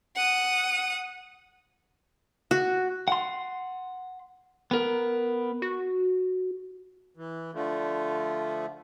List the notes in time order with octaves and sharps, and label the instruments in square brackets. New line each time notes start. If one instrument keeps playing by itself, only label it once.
[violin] F#5 D#6
[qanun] F#4
[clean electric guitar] F#5 C6
B3 A#4
[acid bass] F#4
[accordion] E3
D3 F3 A3